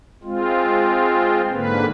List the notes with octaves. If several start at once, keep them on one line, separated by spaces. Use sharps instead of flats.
G#3 C4 F4
G#2 D3 A#3 B4